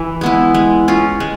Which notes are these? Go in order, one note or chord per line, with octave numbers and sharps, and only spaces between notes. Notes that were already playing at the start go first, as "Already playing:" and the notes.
Already playing: E3 E4
G#3 B3 E4
G#3
C#4 F4
G#3